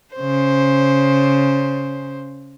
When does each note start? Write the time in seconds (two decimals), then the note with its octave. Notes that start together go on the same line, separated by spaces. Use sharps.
0.15 C#3 C5